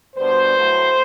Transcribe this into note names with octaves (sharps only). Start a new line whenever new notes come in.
B2 G3 B3 D4 C5
A2 F#3 A3